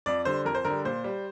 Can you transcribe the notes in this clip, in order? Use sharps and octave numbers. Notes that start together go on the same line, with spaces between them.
F2 D5
D3 G3 C5
F2 A#4
C5
D3 A#4
G3
A#2 C5
G3